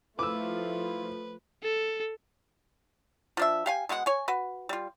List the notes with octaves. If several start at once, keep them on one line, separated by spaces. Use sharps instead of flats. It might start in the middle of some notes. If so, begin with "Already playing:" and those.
F3 A3 E4 F4 B4 D6 E6
A4
F3 D4 E5
G4 F5 G#5
B2 G#3 C4 F#5
C#5 G#5
F#4 B4
G3 F4